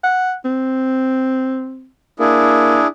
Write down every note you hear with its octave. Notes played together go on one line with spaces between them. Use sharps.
F#5
C4
A#3 D4 E4 G#4